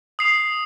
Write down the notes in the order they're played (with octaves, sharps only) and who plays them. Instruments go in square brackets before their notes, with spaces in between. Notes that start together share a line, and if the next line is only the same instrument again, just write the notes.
[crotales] D#6 C7 F7